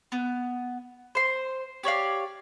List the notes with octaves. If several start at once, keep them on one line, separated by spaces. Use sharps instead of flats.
B3
C5 C6
G4 C#5 D5 F5